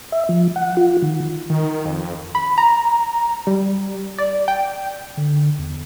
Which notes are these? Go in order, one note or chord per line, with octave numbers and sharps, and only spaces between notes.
E5
F3
F#5
F4
D#3
D#3
F2
B5
A#5
G3
D5
G5
D3
E2